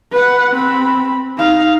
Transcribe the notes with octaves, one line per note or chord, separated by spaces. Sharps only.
B4 F#5
C4 B5
D#4 F5